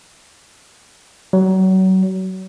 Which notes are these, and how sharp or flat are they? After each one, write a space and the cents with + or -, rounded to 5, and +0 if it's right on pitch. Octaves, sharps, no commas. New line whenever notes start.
F#3 +30